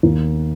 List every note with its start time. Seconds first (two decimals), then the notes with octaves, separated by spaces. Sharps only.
0.03 D#2